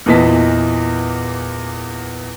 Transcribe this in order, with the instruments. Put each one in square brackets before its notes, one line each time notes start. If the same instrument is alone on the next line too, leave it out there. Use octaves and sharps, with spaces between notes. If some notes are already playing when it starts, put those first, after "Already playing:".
[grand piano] E2 A#2 E3 D#5 A5 B6